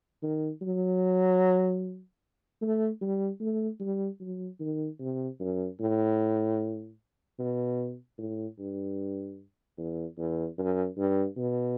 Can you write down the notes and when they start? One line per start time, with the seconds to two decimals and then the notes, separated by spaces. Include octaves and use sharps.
0.22 D#3
0.62 F#3
2.61 A3
3.01 G3
3.41 A3
3.80 G3
4.20 F#3
4.60 D#3
5.00 C3
5.39 F#2
5.80 A2
7.39 B2
8.18 A2
8.59 G2
9.77 E2
10.18 E2
10.58 F#2
10.97 G2
11.37 B2